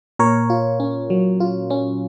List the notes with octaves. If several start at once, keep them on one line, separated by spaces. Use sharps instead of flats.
A#2 A#4 C#5
F4
C#4
F#3
F4
C#4